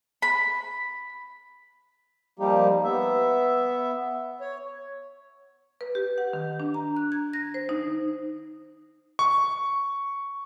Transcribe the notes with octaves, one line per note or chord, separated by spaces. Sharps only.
B5
F3 G3 A#3 D#4 G4
B3 E5
C#5
B4
G4
F#5
D#3
D4
A#5
F#6
G#6
A#6
C5
D#4
C#6